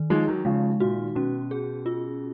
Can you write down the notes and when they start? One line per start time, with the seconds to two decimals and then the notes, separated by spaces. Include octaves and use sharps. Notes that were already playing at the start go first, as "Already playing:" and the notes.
Already playing: D#3
0.10 F3 G#3 D#4
0.27 D#3 F#3
0.45 C#3 F3 G#3
0.80 A#2 F#4
1.15 B2 C#4
1.51 G#4
1.86 F4